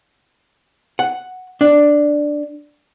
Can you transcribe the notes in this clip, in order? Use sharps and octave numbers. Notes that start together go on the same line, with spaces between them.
F#5
D4